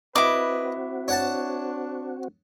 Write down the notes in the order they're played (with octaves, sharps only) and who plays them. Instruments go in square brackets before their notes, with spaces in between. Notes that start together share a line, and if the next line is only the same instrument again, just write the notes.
[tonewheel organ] C4 F#4 [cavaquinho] E4 D6 [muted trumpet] B4 [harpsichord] D#5
[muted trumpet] D4 [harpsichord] C#5 F#5 A5